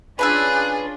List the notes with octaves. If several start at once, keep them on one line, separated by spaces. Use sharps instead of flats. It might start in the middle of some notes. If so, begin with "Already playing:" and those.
C#4 D4 F4 G#4 B4 G#5 E6 F#6